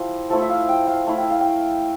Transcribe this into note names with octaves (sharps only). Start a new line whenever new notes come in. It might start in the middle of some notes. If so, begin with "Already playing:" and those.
Already playing: F3 E4 G4
F3 A3 E4 A4
E5
F5
G5
F5
A3 E4
G5
F5
G5